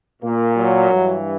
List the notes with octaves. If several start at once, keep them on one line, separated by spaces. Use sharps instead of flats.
A#2 A#3
F#3
G2 E3